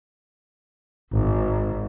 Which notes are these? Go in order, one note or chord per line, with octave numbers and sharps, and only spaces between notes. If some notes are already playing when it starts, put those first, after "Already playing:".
G#1